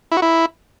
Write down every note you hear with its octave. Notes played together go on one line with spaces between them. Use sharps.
E4
F#4
E4